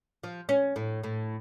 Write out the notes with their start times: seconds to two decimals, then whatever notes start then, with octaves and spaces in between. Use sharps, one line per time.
0.23 F3
0.49 C#4
0.76 A2
1.04 A2